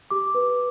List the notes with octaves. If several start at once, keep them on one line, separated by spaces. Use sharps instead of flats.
G4 D6
B4